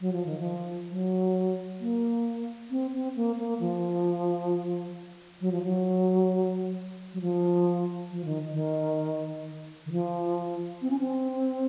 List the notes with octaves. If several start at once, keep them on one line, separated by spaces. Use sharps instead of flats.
F#3
F3
D#3
F3
F#3
A#3
C4
C4
A#3
A#3
F3
F#3
F3
F#3
F#3
F3
F3
D#3
D#3
D#3
F3
C4
C#4
C4